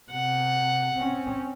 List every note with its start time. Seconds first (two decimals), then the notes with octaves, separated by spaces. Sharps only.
0.11 C3 F#5
0.95 C4 C#4